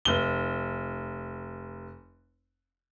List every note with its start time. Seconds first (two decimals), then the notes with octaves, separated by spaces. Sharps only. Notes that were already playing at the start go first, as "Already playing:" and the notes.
0.05 F1 G7